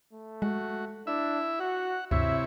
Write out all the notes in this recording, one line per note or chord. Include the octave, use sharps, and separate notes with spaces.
A3
G#3 F#4
D4 E4 E5
F#4 F#5
D2 G2 C3 E4 C#5 E5